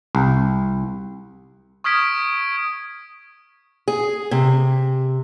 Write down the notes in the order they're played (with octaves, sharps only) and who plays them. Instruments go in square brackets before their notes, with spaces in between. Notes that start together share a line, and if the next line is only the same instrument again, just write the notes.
[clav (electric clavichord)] C2
[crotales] C#6 D#6 F6 G#6 B6 D7
[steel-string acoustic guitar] G#4
C3